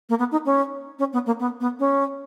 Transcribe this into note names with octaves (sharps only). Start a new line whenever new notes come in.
A#3
B3
D#4
C#4
C#4
B3
A#3
B3
B3
C#4